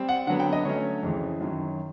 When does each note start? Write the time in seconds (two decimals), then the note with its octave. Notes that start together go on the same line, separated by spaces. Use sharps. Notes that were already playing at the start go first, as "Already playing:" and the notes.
Already playing: G3 C4
0.09 F#5
0.27 D3 F#3 B3 F#5
0.40 G5
0.53 D#5
0.65 D3 F#3 A3 C#4 C#5
1.03 F2 C#3 E3
1.41 F#2 D#3 F#3